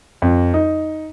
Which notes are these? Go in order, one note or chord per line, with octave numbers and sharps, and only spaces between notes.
F2
D#4